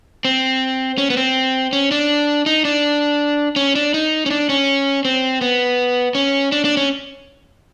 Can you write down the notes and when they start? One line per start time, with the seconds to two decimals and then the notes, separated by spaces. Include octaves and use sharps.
0.25 C4
0.98 C#4
1.10 B3
1.17 C4
1.73 C#4
1.91 D4
2.46 D#4
2.65 D4
3.56 C#4
3.75 D4
3.94 D#4
4.26 C#4
4.31 D4
4.49 C#4
5.05 C4
5.41 B3
6.15 C#4
6.52 D4
6.65 D4
6.77 C#4